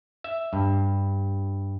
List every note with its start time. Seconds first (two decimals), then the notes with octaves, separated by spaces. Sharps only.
0.24 E5
0.53 G2